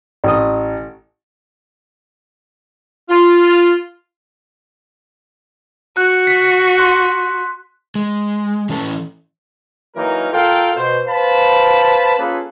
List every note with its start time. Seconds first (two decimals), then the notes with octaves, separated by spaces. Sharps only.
0.24 A1 D#6
3.09 F4
5.97 F#4 F#6
6.27 B6
6.78 C6 F#6
7.95 G#3
8.69 E3 C#4 A4
9.95 E3 F#3 A#3 D#4 A#4
10.32 F4 A4 A#4 F5 G5
10.75 B2 C5
11.07 B4 C5 F5 A5 B5
12.19 A#3 C#4 F4 G#4 A4 B4